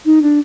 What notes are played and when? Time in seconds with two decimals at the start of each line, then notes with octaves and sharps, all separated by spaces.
0.05 D#4
0.22 D4